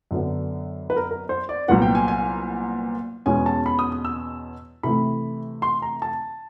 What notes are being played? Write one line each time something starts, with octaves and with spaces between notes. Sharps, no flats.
F#2 D3 F#3 B3
B4
A#4
A#4
C5
D5
C2 A#2 F#3 B3 F#5
G5
G#5
G#5
E2 B2 G#3 C#4 G#5
A5
B5
D#6
D#6
E6
C3 E3 A3 B5
C6
A#5
A5